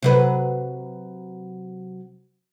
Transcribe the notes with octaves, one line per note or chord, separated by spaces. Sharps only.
C3 F#3 B4